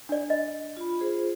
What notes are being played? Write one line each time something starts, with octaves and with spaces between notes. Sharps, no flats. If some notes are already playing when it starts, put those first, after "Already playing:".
D4 D5
D#5
F4 B5
F4 G#4 C5